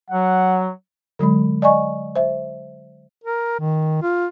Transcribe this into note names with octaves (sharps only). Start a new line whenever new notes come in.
F#3 F#5
D3 F#3 G#3 B5
D5 D#5 G#5 C#6
C5 E5
A#4
D#3
F4